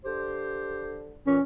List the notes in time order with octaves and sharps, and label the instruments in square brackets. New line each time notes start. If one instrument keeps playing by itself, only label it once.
[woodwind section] D3 G4 C5
[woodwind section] A#2 E3 [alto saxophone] C#4